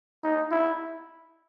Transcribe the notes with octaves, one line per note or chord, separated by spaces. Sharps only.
D#4
E4